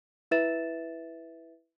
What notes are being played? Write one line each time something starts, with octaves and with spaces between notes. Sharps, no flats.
E4 B4 E5 A6 E7